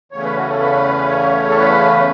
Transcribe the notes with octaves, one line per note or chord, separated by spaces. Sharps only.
E2 C#3 A3 C#4 C#5
B4
F#4
A4
B4
C#5
A4
B4